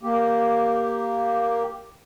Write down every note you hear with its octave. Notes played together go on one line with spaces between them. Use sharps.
A#3 G4